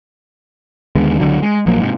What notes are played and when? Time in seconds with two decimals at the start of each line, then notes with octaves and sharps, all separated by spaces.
0.95 D#2 D3 G#3 B3
1.19 C#2 D3 F#3
1.42 G#3
1.66 A#1 F3 F#3 A#3
1.78 G#2 C3